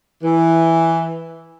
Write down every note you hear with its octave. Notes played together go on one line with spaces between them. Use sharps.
E3